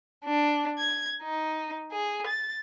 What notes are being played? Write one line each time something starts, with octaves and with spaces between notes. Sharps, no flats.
D4
G#6
D#4
G#4
A6